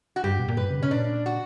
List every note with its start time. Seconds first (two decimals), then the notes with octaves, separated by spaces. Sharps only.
0.16 F#4
0.24 G2 G4
0.39 B2
0.48 A#2
0.57 G2 B4
0.70 C#3
0.80 B2 C#4
0.91 A#2 D4
1.26 F#4